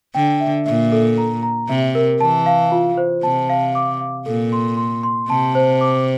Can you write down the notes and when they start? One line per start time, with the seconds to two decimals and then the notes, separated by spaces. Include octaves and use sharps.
0.15 D3 G5
0.40 E5
0.66 A#2 E5
0.92 A4
1.18 A#5
1.43 A#5
1.69 C3 E5
1.95 A#4
2.20 E3 A5
2.46 F5
2.72 F4
2.98 C5
3.23 C3 A5
3.49 F5
3.75 D6
4.00 F5
4.26 A#2 A4
4.52 C6
4.77 C6
5.03 C6
5.29 C3 A5
5.55 C5
5.81 D6